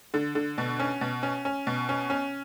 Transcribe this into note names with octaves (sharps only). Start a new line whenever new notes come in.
D3
D3
B2
C#4
B2
C#4
C#4
B2
C#4
C#4